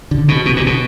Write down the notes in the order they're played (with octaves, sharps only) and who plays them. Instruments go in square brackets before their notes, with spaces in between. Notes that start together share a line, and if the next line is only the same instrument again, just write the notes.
[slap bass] D3
B2
B2
A#2
B2